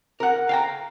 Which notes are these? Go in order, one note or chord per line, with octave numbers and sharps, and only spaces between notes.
A#4 F#5
F5 G5 A#5